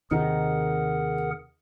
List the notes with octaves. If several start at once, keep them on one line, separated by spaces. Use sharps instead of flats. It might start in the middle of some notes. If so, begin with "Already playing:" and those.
D#2 C3 D#3 D#4 G#4 A#4 F#5